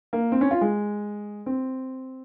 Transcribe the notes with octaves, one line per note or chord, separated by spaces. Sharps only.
A#3
C4
C#4
F4
G#3
C4